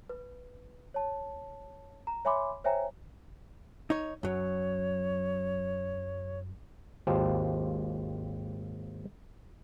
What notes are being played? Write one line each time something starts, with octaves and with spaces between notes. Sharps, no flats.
B4
C#5 A5
A#5
C#5 E5 G#5 B5 C6 D6
C5 C#5 E5 G5 G#5 A#5
D#4 C#5
F#2 F#3 C#5
G#1 D#2 F4 G4 C5 A5